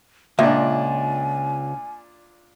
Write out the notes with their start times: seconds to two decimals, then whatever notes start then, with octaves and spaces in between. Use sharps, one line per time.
0.39 C#2 A#2 D4 E5 G#5